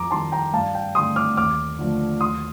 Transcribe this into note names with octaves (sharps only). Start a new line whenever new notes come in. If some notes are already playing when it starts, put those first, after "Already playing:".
Already playing: F2 A#5 D6
D#3 G3 A5 C6
G5 A#5
G2 F5 A5
G5
D3 A3 C6 D#6
D6 F6
D#2 D6 F6
D3 F3 A3
D#2 C6 D#6